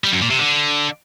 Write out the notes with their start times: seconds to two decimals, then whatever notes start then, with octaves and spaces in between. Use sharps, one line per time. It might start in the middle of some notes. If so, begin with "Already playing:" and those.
0.04 G3
0.13 F#2
0.21 A#2
0.30 C3
0.39 D3